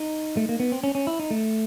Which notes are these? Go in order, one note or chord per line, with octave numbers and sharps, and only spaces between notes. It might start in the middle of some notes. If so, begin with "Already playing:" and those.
Already playing: D#4
A3
A#3
B3
C4
C#4
C#4
E4
D#4
A3